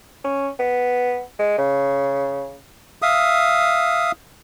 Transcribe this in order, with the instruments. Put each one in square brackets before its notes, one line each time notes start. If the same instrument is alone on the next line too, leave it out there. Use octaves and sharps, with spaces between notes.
[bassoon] C#4
B3
G#3
C#3
[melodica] E5 F5 D#6